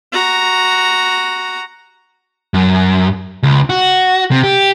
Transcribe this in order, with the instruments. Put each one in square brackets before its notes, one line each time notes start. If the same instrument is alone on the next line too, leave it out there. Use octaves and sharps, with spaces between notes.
[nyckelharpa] F#4 A#5
[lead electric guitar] F#2
C#2
F#4
C3
G4